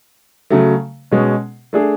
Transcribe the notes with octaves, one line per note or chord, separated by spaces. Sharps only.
C#3 F#3 A3
B2 G#3 C#4
A3 D4 G#4